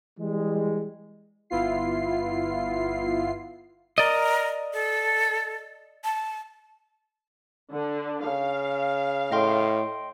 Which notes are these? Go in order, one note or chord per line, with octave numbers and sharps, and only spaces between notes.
E3 G3 G#3
G1 B3 E4 F4 C7
A#4 D5 D#5
A4
A5
D3
C#3 F5
A2 D#5 G5 C6